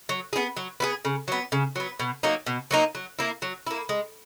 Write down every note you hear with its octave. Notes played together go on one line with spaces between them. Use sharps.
F#3
B3 E4 G#4
F#3
B3 E4 G#4
C#3
F#3 B3
C#3
F#3 B3
B2
F#3 A#3 D#4
B2
F#3 A#3 D#4
F#3
A#3 E4
F#3
A#3 E4
G#3